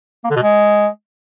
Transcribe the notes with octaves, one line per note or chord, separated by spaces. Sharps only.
A#3
D3
B2
G#3